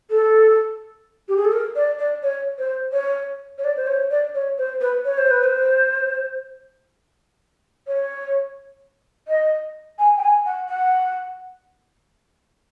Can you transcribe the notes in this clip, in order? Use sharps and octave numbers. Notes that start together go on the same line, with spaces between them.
A4
G4
G#4
A4
A#4
D5
D5
C#5
C5
C#5
C#5
D5
C5
C#5
D5
C#5
C5
B4
C#5
C5
B4
C5
C#5
D#5
G#5
G5
G#5
F#5
F#5